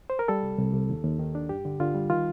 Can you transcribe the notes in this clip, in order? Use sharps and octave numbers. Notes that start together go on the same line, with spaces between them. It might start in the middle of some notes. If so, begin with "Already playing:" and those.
C5
A#4
G3 A4
C2
C2
C2
D#2
D#2
D#3
D4
G2 G4
D3
D3 F4
G3
D#3 F4